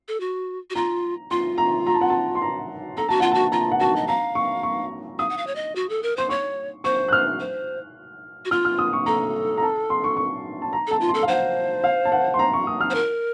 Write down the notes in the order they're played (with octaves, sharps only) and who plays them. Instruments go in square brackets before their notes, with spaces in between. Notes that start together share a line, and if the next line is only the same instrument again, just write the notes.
[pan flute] A4
F#4
F#4
[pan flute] F4 [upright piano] A#5
[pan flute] F4 [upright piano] C6
[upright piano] A#5
A#5
A5
F#5
A5
C6
A#5
[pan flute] A4 [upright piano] A#5
[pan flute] F#4 [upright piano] A5
[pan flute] F4 [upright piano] F#5
[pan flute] F#4 [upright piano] A5
[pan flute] F4 [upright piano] A#5
[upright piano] A5
F#5
[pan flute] F#4 [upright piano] A5
[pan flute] D#5
[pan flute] F5 [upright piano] A#5
[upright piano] C#6
C#6
[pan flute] F5 [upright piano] D#6
[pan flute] F#5
F5
C#5
D#5
F#4
A4
A#4
[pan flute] C5 [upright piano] C6
[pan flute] C#5 [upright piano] C#6
[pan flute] C5 [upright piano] C#6
[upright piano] F#6
F6
[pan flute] C5
F#4
[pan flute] F4 [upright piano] F6
[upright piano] F6
D#6
C#6
[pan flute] A4 [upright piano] A#5
[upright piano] A#5
A5
C6
C#6
C#6
A5
A#5
[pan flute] A4 [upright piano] A5
[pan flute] F4
[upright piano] C6
[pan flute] A4
[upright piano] F5
[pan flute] C5 [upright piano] F#5
[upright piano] F5
A5
F#5
C6
A#5
C#6
D#6
F6
[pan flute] C5
A#4